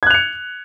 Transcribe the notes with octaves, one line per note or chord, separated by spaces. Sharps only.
F#6 G#6 C#7 F7